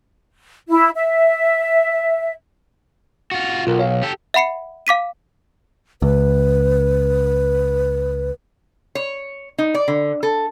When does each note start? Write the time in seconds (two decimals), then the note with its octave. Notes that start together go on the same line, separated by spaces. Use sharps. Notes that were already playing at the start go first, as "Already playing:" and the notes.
0.69 E4
0.95 E5
3.31 F4 F#4
3.67 B1 F4 A#4
3.79 C#5 F5
4.03 G4 A4
4.34 E5 F#5 B5 C7 C#7
4.87 F5 D6 B6 D#7
6.02 C#2 B4
8.95 C#5
9.58 D#4
9.74 D5
9.88 D3
10.23 A4